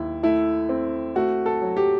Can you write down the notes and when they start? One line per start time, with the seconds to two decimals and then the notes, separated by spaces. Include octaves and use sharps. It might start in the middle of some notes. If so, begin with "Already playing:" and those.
Already playing: D#2 E4
0.23 A3 E4
0.69 C4
1.15 A3 F#4
1.46 A4
1.62 F#3
1.77 G4